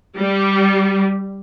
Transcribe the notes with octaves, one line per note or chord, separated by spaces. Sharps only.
G3